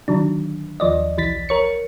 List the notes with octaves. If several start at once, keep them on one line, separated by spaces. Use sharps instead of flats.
D3 D#3 F#3 D4
D#2 F3 D5 D#5
B1 E3 A6 B6
A#4 C#5 C#7